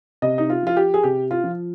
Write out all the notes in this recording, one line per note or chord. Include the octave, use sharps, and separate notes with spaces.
C3 D#5
D#4
F4
F3 F4
G4
G#4
C3 G4
F4
F3